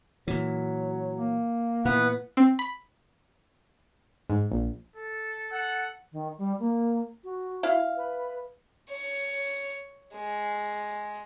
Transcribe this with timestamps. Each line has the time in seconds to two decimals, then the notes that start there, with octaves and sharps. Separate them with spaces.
0.28 A#2 E3 F#3
1.17 A#3
1.85 A#2 E3 B3 B4 F#5
2.37 C4
2.59 B5
4.30 G#2
4.52 A#1
4.96 A4
5.52 A4 F#5
6.12 D#3
6.38 G3
6.59 A#3
7.24 F#4
7.63 E4 F5
7.97 B4
8.90 C#5
10.15 G#3